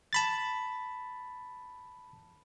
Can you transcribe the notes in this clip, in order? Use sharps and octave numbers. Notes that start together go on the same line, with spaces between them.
A5 B5 A6